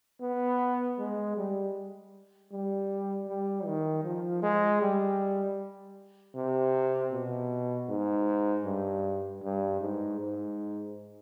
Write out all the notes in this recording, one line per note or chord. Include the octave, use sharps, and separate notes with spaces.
B3
G#3
G3
G3
G3
D#3
F3
G#3
G3
C3
B2
G#2
G2
G2
G#2
G#2